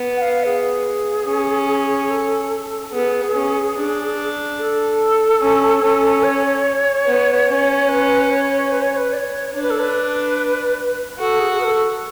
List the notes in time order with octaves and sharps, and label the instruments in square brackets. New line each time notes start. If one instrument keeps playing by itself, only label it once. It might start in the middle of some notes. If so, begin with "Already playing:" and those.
Already playing: [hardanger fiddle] B3
[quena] F#5
F5
G#4
[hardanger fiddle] C#4
[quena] A4
[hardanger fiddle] B3 [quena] G#4
[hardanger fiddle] C#4
D4
[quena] A4
[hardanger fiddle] C#4
C#4
[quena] C#5
[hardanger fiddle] B3
C#4
[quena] B4
C#5
B4
C#5
C#5
B4
D5
C#5
[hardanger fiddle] D4 [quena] C#5
[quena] B4
A4
B4
[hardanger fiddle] F#4 [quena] A4
[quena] G#4
G#4
B4
A4